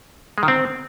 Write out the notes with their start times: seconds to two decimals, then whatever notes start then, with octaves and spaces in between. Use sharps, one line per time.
0.38 G#3
0.43 D#3
0.48 C4